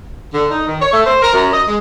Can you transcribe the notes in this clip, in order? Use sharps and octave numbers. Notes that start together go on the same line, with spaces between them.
D3
D#4
D#3
C#5
A3
C5
A#4
F#2
D#5
G#3